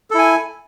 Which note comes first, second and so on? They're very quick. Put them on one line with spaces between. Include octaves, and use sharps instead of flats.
A4 E4 G#5